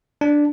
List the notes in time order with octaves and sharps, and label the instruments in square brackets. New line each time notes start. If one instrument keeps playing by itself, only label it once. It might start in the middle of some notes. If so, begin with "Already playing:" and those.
[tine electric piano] D4